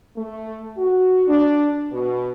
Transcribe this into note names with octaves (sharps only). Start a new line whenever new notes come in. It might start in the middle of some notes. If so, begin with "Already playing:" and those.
A3
F#4
D4
B2